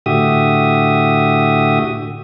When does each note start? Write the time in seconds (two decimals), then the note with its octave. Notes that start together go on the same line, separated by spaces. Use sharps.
0.06 A2 D3 F#4 G4 E5 D#6